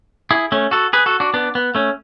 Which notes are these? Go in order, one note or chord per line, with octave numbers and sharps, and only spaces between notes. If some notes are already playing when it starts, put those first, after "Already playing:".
E4 G#4
A3 C#4
F#4 A4
G#4 B4
F#4 A4
D4 F#4
B3 D4
B3
A3 C#4